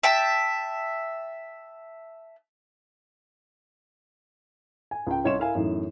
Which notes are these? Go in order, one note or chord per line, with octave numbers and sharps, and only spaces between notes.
E5 G5 A5
G#5
C#2 G5
C2 C#4 C#5 D#5 C6 E7
E4 A#4 F5 G#5
F#2 A2 E3 A3 D#4